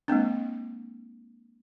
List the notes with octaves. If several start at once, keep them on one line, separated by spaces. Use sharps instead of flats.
G#3 A#3 C4 D4